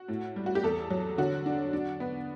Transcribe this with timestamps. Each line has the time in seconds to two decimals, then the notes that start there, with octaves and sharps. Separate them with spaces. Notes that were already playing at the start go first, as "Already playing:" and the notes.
Already playing: F#4
0.08 A2
0.36 G3
0.46 F#4
0.55 G4
0.63 E2 A4
0.90 F#3
1.18 D3 F#4
1.46 D4
1.73 D4
2.00 B3